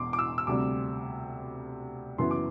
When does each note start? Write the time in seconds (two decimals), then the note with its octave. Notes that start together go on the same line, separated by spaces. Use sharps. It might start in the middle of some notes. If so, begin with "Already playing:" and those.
Already playing: E1 E2 C6 D6
0.13 D6
0.19 E6
0.38 E6
0.47 D2 C3 G3 D6
2.18 F#1 F#2 E3 B3 E4 C6
2.31 D6